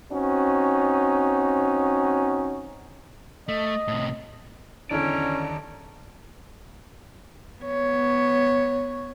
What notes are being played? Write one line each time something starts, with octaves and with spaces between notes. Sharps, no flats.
C4 C#4 D#4 F#4
A3 D#5
A2 C3
E2 D3 D#3 C#4 D5 A5 A#5
B3 C#5